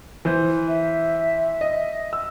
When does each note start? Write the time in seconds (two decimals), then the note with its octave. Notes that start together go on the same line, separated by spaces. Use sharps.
0.25 E3 C5
0.68 E5
1.61 D#5
2.13 E6